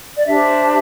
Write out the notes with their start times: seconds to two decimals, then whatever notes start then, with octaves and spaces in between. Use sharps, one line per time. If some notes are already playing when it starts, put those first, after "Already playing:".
0.16 D5
0.26 D4 G4 C5 E5